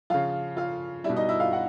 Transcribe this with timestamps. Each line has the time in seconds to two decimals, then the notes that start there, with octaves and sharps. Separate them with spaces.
0.10 C#3 F3 F4 F5
0.57 F4 F5
1.04 G3 E4 E5
1.09 B2
1.16 D#4 D#5
1.29 E4 E5
1.40 F4 F5
1.52 F#4 F#5